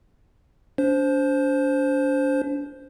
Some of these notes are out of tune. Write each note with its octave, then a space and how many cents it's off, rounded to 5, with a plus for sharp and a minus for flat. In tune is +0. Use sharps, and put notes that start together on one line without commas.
D4 -40 C5 +0